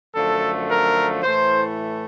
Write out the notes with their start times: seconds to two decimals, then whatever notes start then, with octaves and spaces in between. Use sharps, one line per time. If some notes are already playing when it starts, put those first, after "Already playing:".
0.15 F#2 D3 F3 A3 A4
0.69 A#4
1.23 A2 E3 A3 C5